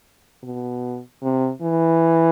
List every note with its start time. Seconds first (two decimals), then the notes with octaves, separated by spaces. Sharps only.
0.43 B2
1.22 C3
1.62 E3